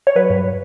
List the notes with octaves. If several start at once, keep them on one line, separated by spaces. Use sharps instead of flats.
C#5
F#3 B4
G2